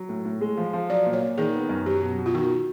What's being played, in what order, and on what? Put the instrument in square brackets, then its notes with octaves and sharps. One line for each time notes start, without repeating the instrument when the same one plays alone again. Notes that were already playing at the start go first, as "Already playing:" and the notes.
Already playing: [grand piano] F#3
A2
A2
G#3
F3
F3
[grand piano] F#3 [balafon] D5
[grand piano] A#2
[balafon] C#5
[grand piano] A#2
[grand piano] D#3 [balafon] G#4
[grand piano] B3
F#2
[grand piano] F#3 [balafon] G4
[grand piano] B2
B2
[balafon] F4
[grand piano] D#3 [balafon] F#4